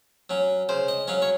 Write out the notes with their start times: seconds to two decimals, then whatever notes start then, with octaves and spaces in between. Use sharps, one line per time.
0.30 F#3 C#4
0.69 C#3 C5
0.88 D#5
1.08 F#3 C#4 F5
1.22 C#5